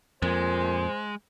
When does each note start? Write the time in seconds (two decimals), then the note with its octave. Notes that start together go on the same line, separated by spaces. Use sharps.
0.22 F2 A#2 G#3 C5